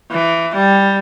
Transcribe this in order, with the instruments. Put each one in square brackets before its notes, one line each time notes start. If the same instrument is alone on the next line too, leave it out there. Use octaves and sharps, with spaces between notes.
[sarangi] E3
G3